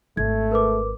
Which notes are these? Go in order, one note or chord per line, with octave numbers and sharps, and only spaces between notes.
G#1 A3 G#6
A#4 B4 D6